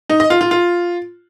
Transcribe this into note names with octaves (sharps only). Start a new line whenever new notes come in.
D#4
D#5
F4
F4
F4